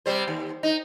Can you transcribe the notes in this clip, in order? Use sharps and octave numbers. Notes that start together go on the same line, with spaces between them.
C3 G3 C5
D#2
D#4